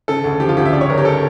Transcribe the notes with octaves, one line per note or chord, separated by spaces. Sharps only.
C#3 A4
D2
F3 G4
F4
D2 G4
E5
C#3 D5
C#5
G1 A#4
G4
A4